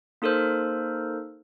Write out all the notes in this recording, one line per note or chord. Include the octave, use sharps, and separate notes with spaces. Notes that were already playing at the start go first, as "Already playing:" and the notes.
A#3 D#4 A4 A#4 C5